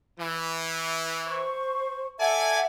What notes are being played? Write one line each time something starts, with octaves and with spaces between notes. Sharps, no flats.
E3
C5 C#6
A4 D5 E5 F#5 G#5